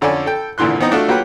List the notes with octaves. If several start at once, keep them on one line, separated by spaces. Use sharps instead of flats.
F2 D3 C#4 A4 D5 G#5
A4 G5
G#1 A#2 D3 E3 C6 F#6
E3 B3 C4 D#4
A3 D4 F4 F#4 A4
F#3 A#3 F4 G4 B4 F#5